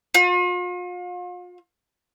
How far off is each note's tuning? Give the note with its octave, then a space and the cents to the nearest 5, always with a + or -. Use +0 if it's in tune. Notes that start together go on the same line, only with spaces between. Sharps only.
F4 +40